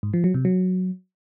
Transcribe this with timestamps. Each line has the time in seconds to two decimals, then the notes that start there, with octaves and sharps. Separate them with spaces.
0.03 G#2
0.14 F3
0.24 F#3
0.34 C3
0.45 F#3